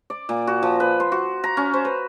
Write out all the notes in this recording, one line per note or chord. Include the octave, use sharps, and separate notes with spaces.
D5
A#2
F#4
F3
B4
C6
F#4
A#5
C#4
C5
B4